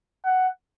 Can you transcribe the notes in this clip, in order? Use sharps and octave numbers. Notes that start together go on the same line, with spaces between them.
F#5